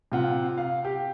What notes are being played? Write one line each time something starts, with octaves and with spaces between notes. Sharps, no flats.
C3 F4 F#5
F5
G4